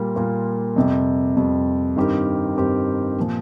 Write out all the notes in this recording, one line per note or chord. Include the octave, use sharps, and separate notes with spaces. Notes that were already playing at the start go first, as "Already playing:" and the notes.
Already playing: A#2 G3 A#3 F4 A#4
A#2 G3 A#3 F4 A#4
F2 C3 G3
F2 C3 G3
G2 D#3 C4 G4 A#4
G2 D#3 C4 G4 A#4
A#2 F3